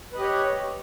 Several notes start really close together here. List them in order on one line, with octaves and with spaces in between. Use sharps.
B4 D#5 G4 C#5